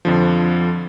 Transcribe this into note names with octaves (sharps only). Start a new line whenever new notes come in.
F2 D3 F3